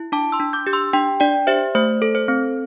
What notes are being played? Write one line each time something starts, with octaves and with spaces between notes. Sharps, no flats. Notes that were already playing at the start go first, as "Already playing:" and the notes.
Already playing: E4
D4 A5 D6
C6 E6
D4
D6 G6
G4 G6
C6 E6
D4 G5 C6
D4 D5 G5
G4 C5 E5
A3 C5
A4
C5
C4